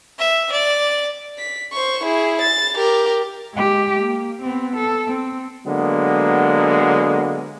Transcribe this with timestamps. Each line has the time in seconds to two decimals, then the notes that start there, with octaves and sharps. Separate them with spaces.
0.18 E5
0.51 D5
1.38 B6
1.72 C5 C#6
2.04 E4 G#4
2.42 A6
2.76 G4 A#4
3.53 G#3 G4
3.99 A#3
4.42 B3 C4
4.76 A4
5.08 C4
5.66 D3 F#3 G#3 A#3 B3